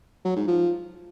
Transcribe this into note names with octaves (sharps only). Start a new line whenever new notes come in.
F#3
G#2
F3